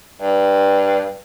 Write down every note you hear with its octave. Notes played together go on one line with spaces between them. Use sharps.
G2